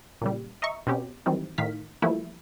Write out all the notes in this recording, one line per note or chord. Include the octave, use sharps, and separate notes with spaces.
A#2 C#3 G3
D#5 E5 A#5 C#6
B2 C4 C#4 G4
D#3 E3 F#3 G3 C4
A2 D#3 F5 B6
E3 F3 G3 A3 A#3 E4